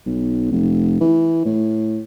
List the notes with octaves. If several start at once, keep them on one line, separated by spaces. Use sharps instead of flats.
B1
F1
E3
A2